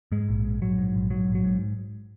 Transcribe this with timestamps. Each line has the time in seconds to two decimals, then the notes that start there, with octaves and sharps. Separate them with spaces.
0.12 G#2 G#3
0.28 A#1
0.45 G#2
0.62 A#1 F#3
0.78 G#2
0.95 A#1
1.10 G#2 F#3
1.27 A#1
1.35 F#3
1.44 G#2